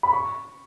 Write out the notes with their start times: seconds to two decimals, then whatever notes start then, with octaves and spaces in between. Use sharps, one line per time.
0.03 B5
0.13 C#6